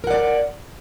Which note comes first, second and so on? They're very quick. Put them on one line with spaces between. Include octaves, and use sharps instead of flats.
A#4 F#5 D5